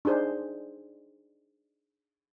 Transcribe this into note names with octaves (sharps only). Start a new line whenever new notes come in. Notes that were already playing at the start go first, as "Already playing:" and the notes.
D4 D#4 G#4 C5